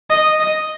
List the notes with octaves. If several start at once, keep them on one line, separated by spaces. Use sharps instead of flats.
D#5
D#5